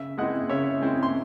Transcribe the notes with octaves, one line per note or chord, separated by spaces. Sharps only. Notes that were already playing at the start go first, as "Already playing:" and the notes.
Already playing: C#3 E5
G#3 C4 E4 D#5 F#5
C#3 C#5 E5
G#3 C4 E4
C6